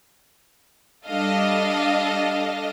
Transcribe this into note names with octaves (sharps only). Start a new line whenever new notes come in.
G3 D4 A4 D#5 F5